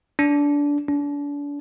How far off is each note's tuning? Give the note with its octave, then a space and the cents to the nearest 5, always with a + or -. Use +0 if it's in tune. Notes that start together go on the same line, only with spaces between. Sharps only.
D4 -20
D4 -35